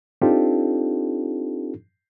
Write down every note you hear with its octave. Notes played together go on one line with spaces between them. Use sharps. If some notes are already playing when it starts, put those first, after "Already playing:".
C4 D4 D#4 F4 G4 A4